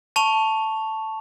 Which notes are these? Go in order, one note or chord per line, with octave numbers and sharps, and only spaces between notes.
A5 C#6 F7